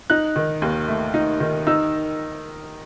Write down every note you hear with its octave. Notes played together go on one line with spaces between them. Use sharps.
D#4 F#6
D#3
D#2
A3
D#4
D#3
D#4 E6